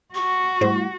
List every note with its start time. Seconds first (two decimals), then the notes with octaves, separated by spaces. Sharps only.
0.15 F#4 C#6
0.61 G#2 G3 A3 E4 C5